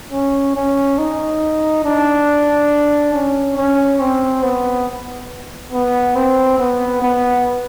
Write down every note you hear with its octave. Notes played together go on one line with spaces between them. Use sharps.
C#4
C#4
D#4
D4
C#4
C#4
C4
B3
B3
C4
B3
B3